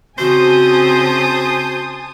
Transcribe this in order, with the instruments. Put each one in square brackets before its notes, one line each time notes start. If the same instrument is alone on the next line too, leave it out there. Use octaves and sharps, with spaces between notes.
[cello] C#3 C4 [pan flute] F#4 [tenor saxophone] C5 [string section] G#5 A5 D#6